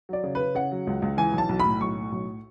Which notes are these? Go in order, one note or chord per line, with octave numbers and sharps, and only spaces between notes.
F#3 D5
C#3
C#3 B4
C#3 F#5
F#3
C#2
C#2
E3 G#5
B1
A5
B1
B5
A2
B1 C#6
A2
B1